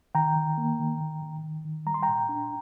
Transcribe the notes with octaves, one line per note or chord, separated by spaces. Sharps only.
D#3 G5 A#5
D#3
A#3
D#3
D#3
D#3
D#3
D#3
G3 A#5
C6
G5 A#5
A#2
D4